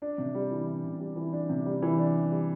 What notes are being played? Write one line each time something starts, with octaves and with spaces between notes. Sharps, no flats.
D4
C3
G3
E3
D4
C3
G3
E3
D4
C3
G3
E3
D4
C3
G3